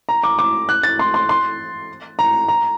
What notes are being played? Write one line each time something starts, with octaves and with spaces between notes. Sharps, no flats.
A#5
D6
D6
F#6
A6
C6
C6
C6
A#5
A#5